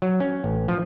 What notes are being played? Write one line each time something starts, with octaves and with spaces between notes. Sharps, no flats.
F#3
C#4
A1
F3